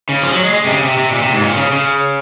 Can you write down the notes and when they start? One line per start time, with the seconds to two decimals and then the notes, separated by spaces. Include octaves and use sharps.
0.09 C#3
0.23 F3
0.33 F#3
0.43 G#3
0.54 G#3
0.64 C3
0.73 C#3
0.83 C3
0.98 C3
1.12 A#2
1.22 C3
1.33 G#2
1.42 A#2
1.57 C#3
1.72 C#3